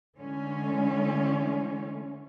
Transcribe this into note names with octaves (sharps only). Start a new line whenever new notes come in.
D3 E3 G#3 A3 C#4